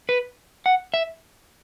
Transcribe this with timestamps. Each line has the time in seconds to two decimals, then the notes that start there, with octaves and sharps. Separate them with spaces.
0.09 B4
0.66 F#5
0.94 E5